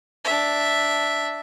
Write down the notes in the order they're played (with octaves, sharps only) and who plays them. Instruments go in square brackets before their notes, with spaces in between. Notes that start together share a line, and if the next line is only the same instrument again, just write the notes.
[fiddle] D4 E5